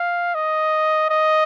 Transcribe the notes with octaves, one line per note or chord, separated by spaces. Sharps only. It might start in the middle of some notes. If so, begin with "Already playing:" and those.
Already playing: F5
D#5
D#5